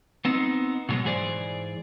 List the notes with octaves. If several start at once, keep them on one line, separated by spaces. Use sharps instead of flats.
B3 C4 D#4
B2 D3 F#3 G#3 B3
G#2 E3 G#4 C5 D5